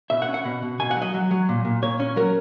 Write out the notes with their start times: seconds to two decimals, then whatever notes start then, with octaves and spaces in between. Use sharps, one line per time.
0.10 B2 E5
0.22 F#5
0.28 C#4
0.34 F#5
0.45 B2
0.62 B2
0.80 B2 G#5
0.91 F#5
0.96 F#3
1.02 D#5
1.14 F#3
1.31 F#3
1.49 A#2
1.65 A#2
1.82 A#2 C#5
2.00 C#4
2.16 F#3 A#4